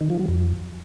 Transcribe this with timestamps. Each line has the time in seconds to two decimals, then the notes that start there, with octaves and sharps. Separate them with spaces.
0.01 D#3
0.10 F3
0.19 F#3
0.28 F2